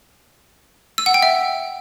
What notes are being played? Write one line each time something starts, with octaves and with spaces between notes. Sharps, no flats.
E6
F#5
G5
E5